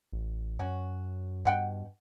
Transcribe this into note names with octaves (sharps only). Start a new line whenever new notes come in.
A1
F#2 C#4 F#4
G2 B2 F#5 G5